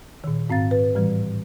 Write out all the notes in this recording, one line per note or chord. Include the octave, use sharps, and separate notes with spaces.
A#2 D#3
G#2 C4 F5 A6
B4
A2 E3 G3